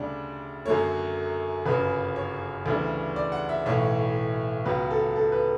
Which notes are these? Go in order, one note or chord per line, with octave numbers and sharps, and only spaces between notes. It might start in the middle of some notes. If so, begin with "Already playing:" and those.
Already playing: D2 C#3 G3 D4 D5
F#2 D3 F#3 A3 C#5
G1 F#2 C#3 B4
C#5
D2 C#3 E3 G3 D4
D5
F#5
E5
B1 A2 E3 C#5
C#2 C#3 F#3 B3 B4
A4
A4
B4